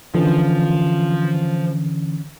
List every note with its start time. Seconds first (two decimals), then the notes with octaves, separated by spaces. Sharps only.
0.15 D3 E3 F3 C#4